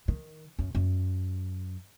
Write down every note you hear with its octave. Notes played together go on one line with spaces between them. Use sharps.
D#3
F#2
F#2